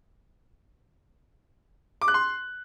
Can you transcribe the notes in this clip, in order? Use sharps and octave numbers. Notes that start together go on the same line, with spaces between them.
D6
F#6
C6